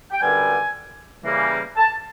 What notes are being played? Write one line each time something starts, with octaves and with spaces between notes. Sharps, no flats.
G5
F#2 D3 G3 B3 G#5
C#3 E3 G3 A#3
A5